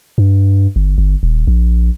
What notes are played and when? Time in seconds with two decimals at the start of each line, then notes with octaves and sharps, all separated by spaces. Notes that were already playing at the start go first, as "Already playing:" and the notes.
0.18 G2
0.76 G1
0.98 G1
1.23 D#1
1.47 A#1